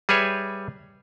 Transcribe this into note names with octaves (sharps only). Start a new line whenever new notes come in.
G3 G#4 B4 C#5 E5